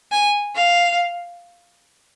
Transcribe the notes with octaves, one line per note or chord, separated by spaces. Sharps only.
G#5
F5